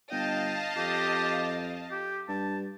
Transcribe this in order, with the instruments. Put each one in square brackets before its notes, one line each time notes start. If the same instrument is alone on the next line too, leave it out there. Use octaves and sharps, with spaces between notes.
[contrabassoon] G1 [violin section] D#5 F5 A5 [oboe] G5
[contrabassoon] F2 [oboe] G4
[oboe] G4
[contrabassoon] G2 [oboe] A5